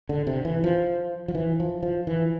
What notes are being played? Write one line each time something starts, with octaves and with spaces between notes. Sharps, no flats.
D3
C3
E3
F3
F3
E3
F3
F3
E3